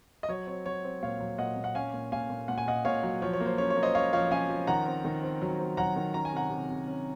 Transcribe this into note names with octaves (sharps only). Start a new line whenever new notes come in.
D#5
F#3 C#5
C4 C#5
F#3 C#5
C4
A#2 C#5 F5
F#3
A#2 D#5 F#5
A#2
F#5
C#4 F5 G#5
A#2
A#2 F5 G#5
A#2
A#2 F#5
G#5
A#2 D#5 F#5
A#2 C#5 F5
F#3
F3 C#5
C#5
A#3
C5
C#4 C#5
C#5
A#3
C5 D#5
C#4 C#5 F5
F3 C#5 F5
C#4 F5 G#5
F3
D#3 F#5 A#5
C4
D#3
C4
F#3
C4
F#3 F#5 A#5
D#3
C#4 A#5
G#5
C3 F#5 A#5
C3
C3
C#4